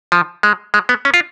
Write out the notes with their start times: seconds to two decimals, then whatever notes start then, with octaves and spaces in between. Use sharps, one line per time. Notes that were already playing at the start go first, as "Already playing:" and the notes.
0.12 F3
0.43 G#3
0.74 G#3
0.89 B3
1.05 C#4
1.14 F4